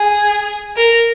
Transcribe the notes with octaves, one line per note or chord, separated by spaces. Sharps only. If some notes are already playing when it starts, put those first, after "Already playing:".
Already playing: G#4
A#4